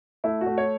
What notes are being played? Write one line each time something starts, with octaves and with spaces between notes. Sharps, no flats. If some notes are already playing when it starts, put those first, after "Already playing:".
A3 E4
F#4
A3
C#5